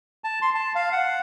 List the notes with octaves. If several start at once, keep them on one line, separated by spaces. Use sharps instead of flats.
A5
C6
A5
F5
F#5